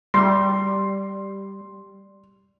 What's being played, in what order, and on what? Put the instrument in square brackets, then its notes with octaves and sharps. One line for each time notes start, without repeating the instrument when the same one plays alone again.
[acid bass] G3 [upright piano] C6